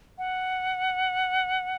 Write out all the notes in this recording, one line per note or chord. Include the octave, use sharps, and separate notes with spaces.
F#5